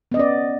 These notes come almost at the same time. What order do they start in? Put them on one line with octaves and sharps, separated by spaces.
B3 D#5 C#4 D5